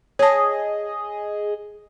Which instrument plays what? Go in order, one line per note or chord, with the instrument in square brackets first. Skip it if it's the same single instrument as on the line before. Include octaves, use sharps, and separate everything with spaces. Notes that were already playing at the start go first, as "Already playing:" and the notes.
[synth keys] G#4 D#5 [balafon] C#5 A5